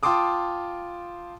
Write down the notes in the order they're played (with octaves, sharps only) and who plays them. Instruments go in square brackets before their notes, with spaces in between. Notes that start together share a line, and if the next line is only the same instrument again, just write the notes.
[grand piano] F4 G5 A5 C6 D6 D#6